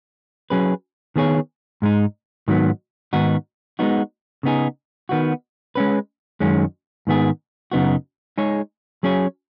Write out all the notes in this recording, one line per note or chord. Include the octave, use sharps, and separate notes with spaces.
F#3 C#4 G#4 B4
D#3 B3 G#4 C#5
G#2 G#3 D#4
G#2 D#3 F#3 B3
G#2 D#3 B3 D#4 F#4
G#3 B3 D#4 F#4
C#3 B3 D#4 G#4
D#3 B3 F#4
G#3 C#4 B4
F#2 D#3 G#3 C#4
G#2 D#3 B3 G#4
F#2 C#3 B3 D#4 F#4
G#3 D#4 G#4 C#5
F#3 C#4 G#4 C#5